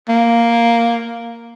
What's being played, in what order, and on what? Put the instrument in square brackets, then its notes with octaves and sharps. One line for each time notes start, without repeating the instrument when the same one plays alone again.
[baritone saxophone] A#3